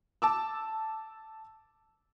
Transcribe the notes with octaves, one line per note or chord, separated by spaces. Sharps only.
A5 D6 E6